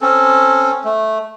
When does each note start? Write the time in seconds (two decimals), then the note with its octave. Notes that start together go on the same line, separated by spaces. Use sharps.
0.01 C4 C#4 A4
0.85 A3